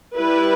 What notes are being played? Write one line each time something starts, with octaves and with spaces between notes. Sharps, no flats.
G3 E4 B4